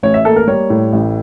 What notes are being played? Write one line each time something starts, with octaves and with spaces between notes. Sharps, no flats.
A1 C#5
E5
A#3 A4
A#4
G3 C#5
A2
A1